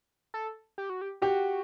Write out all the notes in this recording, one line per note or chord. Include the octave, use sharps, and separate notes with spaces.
A4
G4
F#4
G4
F#4 G4